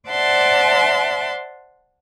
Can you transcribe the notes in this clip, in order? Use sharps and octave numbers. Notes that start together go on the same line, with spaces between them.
C5 D5 E5 F#5 A5 C6